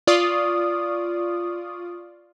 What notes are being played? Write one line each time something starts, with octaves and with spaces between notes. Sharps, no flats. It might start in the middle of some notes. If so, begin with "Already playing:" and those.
F4 D5 C#6 D#6